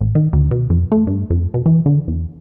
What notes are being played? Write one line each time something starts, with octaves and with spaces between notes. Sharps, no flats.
A1
D#3
D2
B2
F2
A3
G2
F2
B2
E3
D3
E2